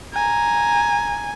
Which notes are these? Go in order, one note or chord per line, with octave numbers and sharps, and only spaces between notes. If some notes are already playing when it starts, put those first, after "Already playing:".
G#5 A#5